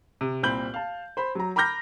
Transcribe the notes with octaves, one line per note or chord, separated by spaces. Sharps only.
C3
C2 A#2 C4 B5 G6 F#7
F5 A5
C5 B5
F#3 A#5
A#5 B5 D6 F6 G6 A#6